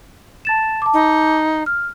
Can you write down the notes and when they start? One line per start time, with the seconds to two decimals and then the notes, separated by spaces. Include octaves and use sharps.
0.45 A5 A6 E7
0.82 A5 D6
0.94 D#4
1.66 F6